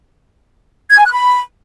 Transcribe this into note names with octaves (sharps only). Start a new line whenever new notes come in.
G#6
G#5
F#6
B5